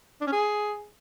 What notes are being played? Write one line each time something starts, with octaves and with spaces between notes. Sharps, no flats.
D4
C#4
G#4